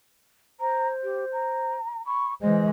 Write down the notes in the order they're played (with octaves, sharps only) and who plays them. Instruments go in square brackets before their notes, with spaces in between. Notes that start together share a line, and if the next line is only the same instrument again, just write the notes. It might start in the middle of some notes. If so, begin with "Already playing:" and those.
[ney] C5 [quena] A#5
[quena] G4
A#5
[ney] B5 [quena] C#6
[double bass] E3 G#3 [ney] C5 [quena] D#5